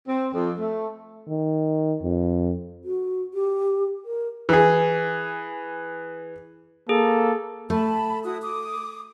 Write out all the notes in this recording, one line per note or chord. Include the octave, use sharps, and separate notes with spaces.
C4
F2
A3
D#3
F2
F#4
G4
A#4
E3 G#4
A#3 G#4 A4
A3 A5 B5
E4 F#4 D#6
D6 D#6